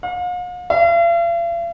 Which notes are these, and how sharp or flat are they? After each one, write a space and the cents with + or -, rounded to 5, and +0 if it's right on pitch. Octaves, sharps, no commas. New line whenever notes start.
F5 +45
F5 -45